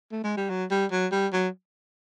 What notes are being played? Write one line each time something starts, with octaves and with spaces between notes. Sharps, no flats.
A3
G#3
G3
F#3
G3
F#3
G3
F#3